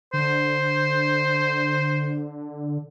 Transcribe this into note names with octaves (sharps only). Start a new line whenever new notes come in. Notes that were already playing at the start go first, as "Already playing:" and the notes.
D3 C5